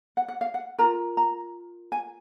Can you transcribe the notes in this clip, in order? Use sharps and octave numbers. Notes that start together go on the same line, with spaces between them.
F#5
F#5
F5
F#5
F4 A#4 A#5
A#5
G#5